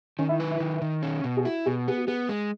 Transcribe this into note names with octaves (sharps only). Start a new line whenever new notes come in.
D#3 C#4
E4
B4
E4
D#3
D#3
C#4
B2
G#4
E4 F#4
B2 G#4
B3 G#4
F#4
B3 G#4
G#3